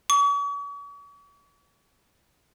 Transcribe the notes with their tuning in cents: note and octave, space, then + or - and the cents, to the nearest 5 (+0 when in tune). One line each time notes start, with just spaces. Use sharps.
C#6 +45